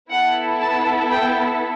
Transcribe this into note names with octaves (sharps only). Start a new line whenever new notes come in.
B3 E4 A4 F#5
A5
G5